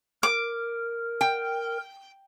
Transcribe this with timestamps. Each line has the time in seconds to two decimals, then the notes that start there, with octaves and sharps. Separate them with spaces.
0.23 A#4 D6
1.21 G5